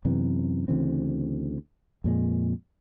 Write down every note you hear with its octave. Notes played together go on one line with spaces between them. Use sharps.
F#2 C3 E3 B3
D2 C#3 E3 C4
F2 A#2 G#3